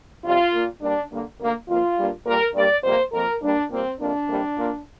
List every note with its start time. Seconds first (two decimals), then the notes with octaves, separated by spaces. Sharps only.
0.24 F2 C3 G3 F4
0.53 A#2 A#3
0.81 G2 G3 A#3 D4
1.11 G2 D3 A#3
1.40 D2 D3 A#3
1.68 F2 F3 A#3 F4
1.97 G2 G3 A#3
2.26 A#2 G3 A#3 A#4
2.55 G2 G3 A#3 D5
2.84 F2 C3 G3 A#3 C5
3.13 F2 F3 A#3 A#4
3.41 G2 G3 A#3 D4
3.71 A#2 G3 A#3 C4
3.99 F2 C3 A#3 D4
4.28 F2 C3 G3 A#3
4.57 A#2 A#3